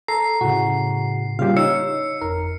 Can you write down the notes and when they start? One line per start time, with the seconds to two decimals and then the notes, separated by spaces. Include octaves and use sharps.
0.08 A4 A#5 C7
0.41 A2 C#3 F#4
1.39 C#3 G3 A#3 F4 G4 F5
1.57 D#4 C#5 E6 C#7
2.21 G1 F2 A#4